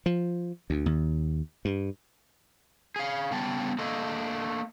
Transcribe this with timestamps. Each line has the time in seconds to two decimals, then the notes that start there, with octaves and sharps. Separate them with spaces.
0.06 F3
0.70 D2
0.86 D#2
1.65 G2
2.96 G#4 F5
3.31 C#3 G3 B3 D4 G5 A5
3.79 A3 A#3 D4 A4 D#5